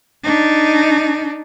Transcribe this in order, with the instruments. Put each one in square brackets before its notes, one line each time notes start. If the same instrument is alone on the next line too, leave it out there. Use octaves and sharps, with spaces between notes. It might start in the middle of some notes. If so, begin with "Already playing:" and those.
[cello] D4 D#4